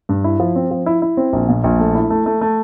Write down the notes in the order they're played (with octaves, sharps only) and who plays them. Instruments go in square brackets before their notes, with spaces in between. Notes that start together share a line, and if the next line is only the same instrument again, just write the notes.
[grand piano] G2
E4
F3
C4
F3
E4
E4
C4
A#1
A#2
A#1
A3
E4
A3
A3
A3